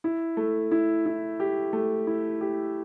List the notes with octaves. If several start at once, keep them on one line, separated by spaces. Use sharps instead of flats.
E4
A3
E4
E4
G4
A3
E4
G4